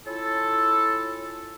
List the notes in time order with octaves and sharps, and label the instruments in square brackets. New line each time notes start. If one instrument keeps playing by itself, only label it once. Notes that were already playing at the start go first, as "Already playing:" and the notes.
[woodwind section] C#4 E4 F4 A4